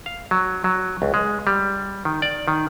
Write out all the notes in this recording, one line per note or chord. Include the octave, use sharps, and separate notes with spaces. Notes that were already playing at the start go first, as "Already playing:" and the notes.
F5
F#3
F#3
C#2
G#3
G3
D#3
D5
D#3